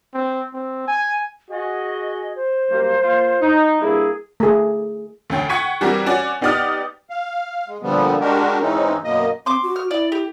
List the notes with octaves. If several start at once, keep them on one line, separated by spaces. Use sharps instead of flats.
C4
C4
G#5
F#4 G#4 D#5
C5
F#2 G3 A#3
A#3 F4 F5
D#4
G2 A#3 E4 G#4
A3 G#4
D2 C#4 G5
F#5 G5 C#6 G#6 B6 D#7
E3 G3 C4 F#4 G4 A#4
C#4 F#4 D5
B3 D#4 G4 D5 D#6 F6
F5
G#3
A#2 D3 F3 G3 B3
G#3 D4 F#4 G4 A#4
G#2 E3 G#3 C4 C#4 D#4
F#2 B2 A#3 D#5
C4 C6 D6
F#4
F6
E4 D5
G4